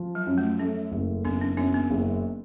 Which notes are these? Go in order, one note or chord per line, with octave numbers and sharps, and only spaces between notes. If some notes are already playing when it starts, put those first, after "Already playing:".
Already playing: F3
F#3
F#2
A3
A3 C#4
F#1
F#1 B3 D4
C#4
F#2 B3 D4
B3
F#1